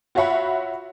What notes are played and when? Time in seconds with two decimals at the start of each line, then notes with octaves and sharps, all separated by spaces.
0.15 F4 F#4 C#5 E5 F#5 B5